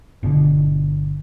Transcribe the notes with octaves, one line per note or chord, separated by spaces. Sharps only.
G1 B2 D3